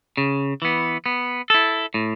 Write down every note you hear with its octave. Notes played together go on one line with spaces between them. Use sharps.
C#3
E3 B3
B3
E4 A4
A2